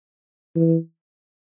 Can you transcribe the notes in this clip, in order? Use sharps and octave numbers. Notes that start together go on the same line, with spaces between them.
E3